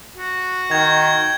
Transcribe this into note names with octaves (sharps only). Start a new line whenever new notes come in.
F#4
D#3 G5 G#6